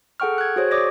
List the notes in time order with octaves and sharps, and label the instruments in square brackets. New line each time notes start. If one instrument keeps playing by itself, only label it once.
[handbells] G#4 A4 F#5 G5 C#6 F6
F#6 G#6
F#4 G#4 C5 C#5
C#5 D5 D6 D#6 G#6 A#6